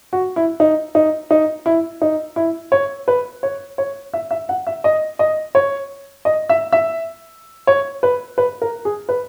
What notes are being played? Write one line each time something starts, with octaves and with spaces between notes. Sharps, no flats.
F#4
E4
D#4
D#4
D#4
E4
D#4
E4
C#5
B4
C#5
C#5
E5
E5
F#5
E5
D#5
D#5
C#5
D#5
E5
E5
C#5
B4
B4
A#4
G#4
B4